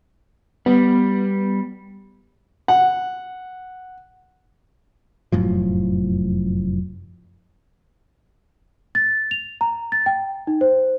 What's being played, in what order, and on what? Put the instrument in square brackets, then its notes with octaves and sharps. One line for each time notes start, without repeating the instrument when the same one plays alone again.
[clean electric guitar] G3 [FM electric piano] B3
[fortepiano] F#5
[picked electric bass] F1 F#2 A2 F3
[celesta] A6
F7
A#5
A6
G5
D#4
C5